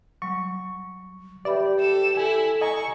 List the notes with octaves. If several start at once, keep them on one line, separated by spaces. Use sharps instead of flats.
F#3 G3 C#6
G4 B4 D5 E5 B5
A4 E7
E4 A4 G#5
D#5 G#5 A#5 C#6